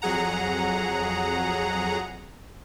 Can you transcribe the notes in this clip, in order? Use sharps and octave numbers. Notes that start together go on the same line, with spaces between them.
F2 F#3 G#4 F#5 A#5